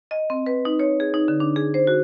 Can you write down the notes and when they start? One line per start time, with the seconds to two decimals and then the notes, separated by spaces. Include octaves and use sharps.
0.11 D#5
0.30 C4
0.46 B4
0.65 D#4
0.79 C#5
1.00 G#4
1.14 D#4
1.28 D3
1.40 D4
1.56 G#4
1.74 C5
1.87 F#4